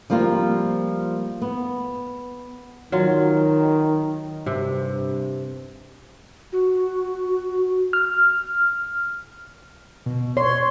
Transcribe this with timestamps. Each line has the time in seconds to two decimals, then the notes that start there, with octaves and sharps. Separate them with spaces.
0.10 F3 G3 A#3 C4 F4
1.42 B3
2.92 D#3 F#3 F4
4.46 G2 C3
6.53 F#4
7.93 F6
10.06 B2
10.37 C#5 C6